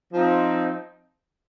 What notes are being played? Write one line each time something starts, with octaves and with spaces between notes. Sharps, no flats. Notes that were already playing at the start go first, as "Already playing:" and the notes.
F3 C4 D#4